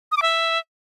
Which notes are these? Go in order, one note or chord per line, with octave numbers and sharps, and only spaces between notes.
D#6
D6
E5